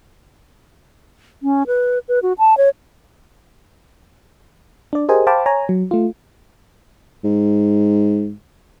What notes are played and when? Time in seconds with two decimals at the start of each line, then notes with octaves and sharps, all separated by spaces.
1.43 C#4
1.67 B4
2.08 B4
2.22 F#4
2.38 A5
2.57 C#5
4.93 D4 D5
5.09 G4 G#4 A#4 C5 D#5 G#5
5.27 C5 F5 G5 A5 B5 D6
5.46 C#5 G#5 A#5
5.69 F#3
5.91 A3 F4
7.24 G#2